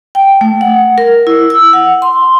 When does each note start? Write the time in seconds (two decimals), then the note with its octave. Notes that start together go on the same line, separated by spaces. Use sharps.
0.15 G5
0.41 A3
0.61 F#5
0.98 A#4
1.27 E4
1.50 E6
1.73 F#5
2.02 C6